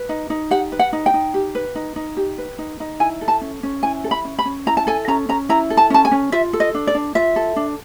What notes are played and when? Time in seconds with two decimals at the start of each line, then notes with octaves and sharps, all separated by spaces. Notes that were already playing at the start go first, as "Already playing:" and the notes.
Already playing: B4
0.09 D#4
0.30 D#4
0.51 G4 F#5
0.72 B4
0.79 F#5
0.93 D#4
1.06 G5
1.14 D#4
1.34 G4
1.55 B4
1.75 D#4
1.96 D#4
2.17 G4
2.38 B4
2.59 D#4
2.80 D#4
3.00 E4 G#5
3.21 A4
3.28 A5
3.41 C#4
3.63 C#4
3.83 E4 G#5
4.04 A4
4.11 B5
4.25 C#4
4.39 B5
4.45 C#4
4.67 E4 A#5
4.77 A5
4.87 A4 G#5
5.08 C#4 A#5
5.29 C#4 A#5
5.49 E4 A#5
5.70 A4
5.77 A5
5.90 C#4 A5
6.05 G#5
6.12 C#4
6.32 F4 E5
6.53 A4
6.60 D#5
6.75 D4
6.87 D5
6.95 D4
7.15 F4 E5
7.36 A4
7.56 D4